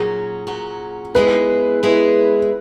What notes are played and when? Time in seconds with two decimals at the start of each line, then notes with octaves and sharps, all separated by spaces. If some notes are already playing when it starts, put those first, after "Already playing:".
Already playing: A#2 F#3 C#4 F#4 G#4
0.47 A#2 F#3 C#4 F#4
1.15 G#3 B3 E4 G#4 B4
1.83 G#3 B3 E4 G#4